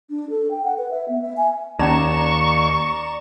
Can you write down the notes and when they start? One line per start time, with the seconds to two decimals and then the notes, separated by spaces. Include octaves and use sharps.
0.10 D4
0.30 A4
0.51 G5
0.64 F#5
0.78 B4
0.91 E5
1.08 B3
1.22 E5
1.37 G#5
1.79 D#2 C#4 D#4 D5 A#5 C#6 E7